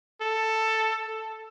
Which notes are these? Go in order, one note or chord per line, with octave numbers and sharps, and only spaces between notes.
A4
A4